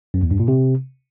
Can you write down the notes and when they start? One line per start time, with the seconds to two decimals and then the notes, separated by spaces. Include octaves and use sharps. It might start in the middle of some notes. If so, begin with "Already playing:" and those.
0.14 F#2
0.23 E2
0.31 G2
0.40 A#2
0.48 C3